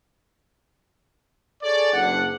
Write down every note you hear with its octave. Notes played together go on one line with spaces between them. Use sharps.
G#4 A4 C#5 D5
F#1 D4 F#5